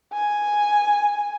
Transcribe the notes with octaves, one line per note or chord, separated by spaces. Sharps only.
G#5